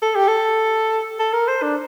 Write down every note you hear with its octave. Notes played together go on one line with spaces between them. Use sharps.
A4
G4
A4
A4
A#4
C5
D4